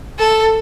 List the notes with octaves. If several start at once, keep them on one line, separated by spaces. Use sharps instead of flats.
A4